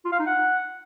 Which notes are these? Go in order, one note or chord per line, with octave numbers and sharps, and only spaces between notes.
F4
F5
D#4
F#5